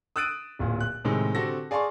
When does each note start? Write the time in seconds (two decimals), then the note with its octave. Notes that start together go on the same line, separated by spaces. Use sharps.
0.16 D#6 E6 F#6 A6 D7 D#7
0.59 D1 A#2
0.80 F#6
1.05 A2 C3 D#3 G#3
1.35 D3 C4 F#4 G4 A4 A#6
1.71 G#4 D5 F5 A5 C6 C#6